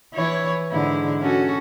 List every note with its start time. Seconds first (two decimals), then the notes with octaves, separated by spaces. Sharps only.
0.14 E3 E4 C#5
0.71 G#2 D3 E4
1.21 C#4 F#4 A4